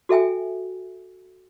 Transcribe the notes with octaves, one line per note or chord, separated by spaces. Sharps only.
F#4 A4 E5 G5 G#5